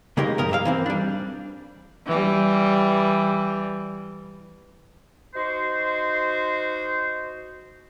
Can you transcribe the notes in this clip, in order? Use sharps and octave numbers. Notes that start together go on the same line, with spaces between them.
C#3 G#3 A#3 D#4 G4 A#4
C2 F2 A#4 D#5
G2 A#3 E5 F5
E3 A#3 C4
G3 D4
E3 G3
D#4 F#4 C5